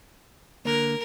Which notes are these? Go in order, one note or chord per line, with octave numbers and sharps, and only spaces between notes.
D3 A#3 A#4